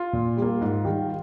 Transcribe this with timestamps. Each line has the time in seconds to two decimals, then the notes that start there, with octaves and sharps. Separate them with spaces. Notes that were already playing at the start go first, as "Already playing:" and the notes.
Already playing: F4
0.13 A#2
0.37 G3
0.42 A#3
0.61 G#2
0.85 D#3 G3